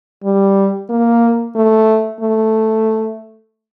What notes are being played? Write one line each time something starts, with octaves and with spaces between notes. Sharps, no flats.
G3
A#3
A3
A3